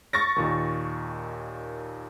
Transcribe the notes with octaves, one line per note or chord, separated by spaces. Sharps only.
C#6 A6 A#6
D#2 A#2 D#3